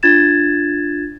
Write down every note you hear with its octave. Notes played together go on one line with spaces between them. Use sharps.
D4 F4 G#6 A6 E7